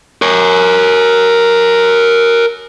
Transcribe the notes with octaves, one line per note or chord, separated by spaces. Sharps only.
A#4 C#5